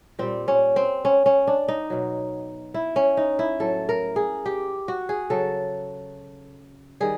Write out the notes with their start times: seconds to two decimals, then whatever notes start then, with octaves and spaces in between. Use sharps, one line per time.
0.19 A#2 G3 C4
0.48 C#4
0.76 C4
1.05 C#4
1.26 C#4
1.47 D4
1.68 D#4
1.90 B2 F#3
2.74 E4
2.96 C#4
3.17 D#4
3.39 E4
3.60 A2 F#3 A4
3.89 A#4
4.16 G#4
4.46 G4
4.88 F#4
5.09 G#4
5.30 C#3 F#3 A4
7.00 D#3 G3 G#4